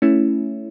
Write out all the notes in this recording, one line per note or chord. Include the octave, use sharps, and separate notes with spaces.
A3 C#4 E4